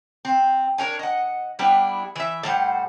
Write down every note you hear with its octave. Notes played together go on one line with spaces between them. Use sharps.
C4
D4 A#4 C#5 G#5
D#5 F#5
G3 B3 D4 E4
E3 E5
A2 G3 C5 F#5